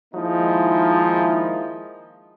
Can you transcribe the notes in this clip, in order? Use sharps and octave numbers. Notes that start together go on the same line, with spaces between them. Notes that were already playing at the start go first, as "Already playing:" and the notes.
D#3 F3 G#3 A#3 D#4 E4